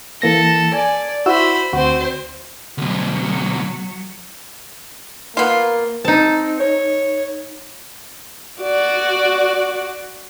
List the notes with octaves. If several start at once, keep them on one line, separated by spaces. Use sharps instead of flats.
E3 A#3 A4 A#6
D5 G#5
E4 F#4 C5 B5 E6
D2 C4 F#4 C5
D2 B2 F#3
A#3 B3 F4
C4 D#4 A5
C#5
F#4 D5